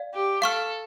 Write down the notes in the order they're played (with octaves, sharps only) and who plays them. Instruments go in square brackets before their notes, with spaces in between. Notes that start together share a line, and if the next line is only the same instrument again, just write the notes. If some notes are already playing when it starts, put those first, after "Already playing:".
Already playing: [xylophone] D5 F5
[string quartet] G4
[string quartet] A4 [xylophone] F5 C#6 F6